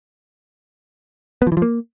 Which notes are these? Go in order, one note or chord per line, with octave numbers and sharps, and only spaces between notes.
B3
F3
E3
F3
A#3